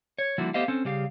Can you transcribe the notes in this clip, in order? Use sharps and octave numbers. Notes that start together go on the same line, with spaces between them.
C#5
D3 F3 G3 A#3 E4 F#4
A3 B3 G4 C5 D#5 F5
C4 C#4 A4 C5
C#3 G3 G4 G#4 F5